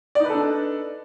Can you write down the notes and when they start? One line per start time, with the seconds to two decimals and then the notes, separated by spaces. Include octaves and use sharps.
0.15 D5
0.20 D#4
0.25 B4
0.30 A4
0.34 D4